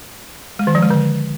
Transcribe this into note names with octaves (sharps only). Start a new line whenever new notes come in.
G#3
D#3
F3
G#3
D3